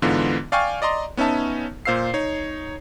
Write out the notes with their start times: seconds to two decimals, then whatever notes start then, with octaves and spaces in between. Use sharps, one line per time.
0.02 G#2 D3 E3 B3 F4
0.52 D5 F5 G5 G#5 C#6 F6
0.82 D5 D#5 A#5 C6
1.17 B3 C#4 D#4 E5 A5
1.85 A#2 C5 F5 E6 C7
2.14 D#4 C#5